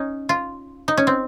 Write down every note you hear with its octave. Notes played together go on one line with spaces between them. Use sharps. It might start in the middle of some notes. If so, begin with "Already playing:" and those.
Already playing: C#4 D#4
F4
D#4
C#4
C4